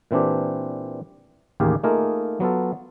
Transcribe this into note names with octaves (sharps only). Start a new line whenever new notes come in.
A#2 E3 C4 D4 G4
A1 D#2 A#3 G4 G#4 F5
A3 A#3 D#4 F4 G#4 A#4
F#3 B3 F4 A4